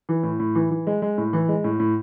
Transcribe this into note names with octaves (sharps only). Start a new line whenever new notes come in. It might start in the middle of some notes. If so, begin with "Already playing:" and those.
E3
A2
A2
E3
E3
G#3
G#3
A2
E3
G#3
A2
A2